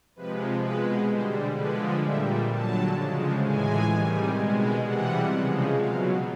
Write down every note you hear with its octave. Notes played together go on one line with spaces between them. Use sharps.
C3 F3 G#3 B4
B2 G#3 B4
D3 G3 C5
D3 F3 G#3 B4
A#2 G3 E5
D3 F#3 A5
C#3 F3 G#3
A2 E3 G#3 G#5
C3 D#3 G3
B2 G#3
C3 E3 G3 F#5
C#3 F3 G#3
B2 F#3 F5